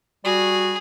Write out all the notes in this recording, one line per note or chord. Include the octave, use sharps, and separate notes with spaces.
G3 F#4 G#4